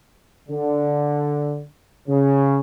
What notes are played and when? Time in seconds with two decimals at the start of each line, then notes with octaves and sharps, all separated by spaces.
0.49 D3
2.08 C#3